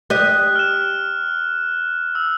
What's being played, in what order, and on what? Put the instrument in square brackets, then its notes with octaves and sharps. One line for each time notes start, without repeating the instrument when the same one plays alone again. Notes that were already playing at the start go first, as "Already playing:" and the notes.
[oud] G4 D#5 [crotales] F#6
[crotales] F6 E7
E6